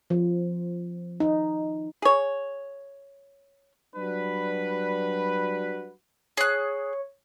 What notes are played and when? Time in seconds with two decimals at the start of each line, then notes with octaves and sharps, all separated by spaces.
0.10 F3
1.20 D#4
2.02 G#4 C#5
3.95 F#3 G3 D4 F#4 B4
6.37 G#4 C#5 F#6